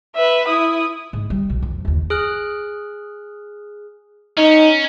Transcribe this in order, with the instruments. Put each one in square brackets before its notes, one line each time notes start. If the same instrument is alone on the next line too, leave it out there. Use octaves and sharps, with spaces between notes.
[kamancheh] B4 E5
E4 D#6
[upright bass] G#2
G3
B1
F2
G1 D#2
[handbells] G#4 F6 F#6
[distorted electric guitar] C#4 [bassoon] D#4